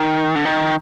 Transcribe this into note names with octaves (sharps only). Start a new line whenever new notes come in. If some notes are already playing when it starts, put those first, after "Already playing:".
Already playing: D#3
D3
D#3